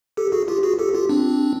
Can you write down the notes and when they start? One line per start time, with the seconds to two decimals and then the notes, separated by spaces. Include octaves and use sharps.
0.17 G4 A4
0.32 F#4 G#4
0.48 F4 G4
0.63 F#4 G#4
0.79 G4 A4
0.94 F4 G4
1.09 C4 D4